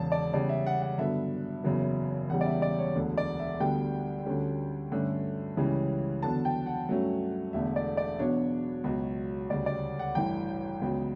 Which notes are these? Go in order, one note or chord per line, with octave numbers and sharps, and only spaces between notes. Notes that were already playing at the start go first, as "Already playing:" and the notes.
Already playing: E1 E2 C#3 A5
D5
E2 C#3 G3 D5
E5
F#5
F#5
G2 D3 F#3 B3 E5
F#1 E2 C#3 F#3 B3
E1 E2 C#3 G3 F#5
D5
E5
D5
C#5
E1 D2 D3
D5
E5
D2 D3 G3 B3 G5
D2 D3 G3 C#4
G2 D3 A3 C#4
C#2 C#3 E3 G3 C#4
E2 D3 F#3 B3 A5
G5
F#5
G2 F#3 A3 C#4
E1 E2 D3 A3 E5
D5
D5
E2 B2 F#3 B3 D4 C#5
C#2 B2 F#3
D2 C#3 G3 D5
D5
F#5
A1 G2 E3 G5
C#2 C#3 F#3 B3